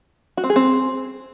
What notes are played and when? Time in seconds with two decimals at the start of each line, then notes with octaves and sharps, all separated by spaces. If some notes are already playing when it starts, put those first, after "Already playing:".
0.37 F#4
0.44 C4
0.50 G#4
0.56 C4